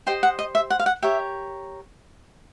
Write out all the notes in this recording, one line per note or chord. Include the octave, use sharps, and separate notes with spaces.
G4 C5 D#5 G5
F#5
D#5
E5
F#5
F5
F#5
G4 A#4 C#5 E5